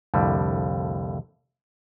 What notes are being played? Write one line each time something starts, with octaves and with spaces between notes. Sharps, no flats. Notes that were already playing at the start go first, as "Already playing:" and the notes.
C2 F2 A2 D3 G3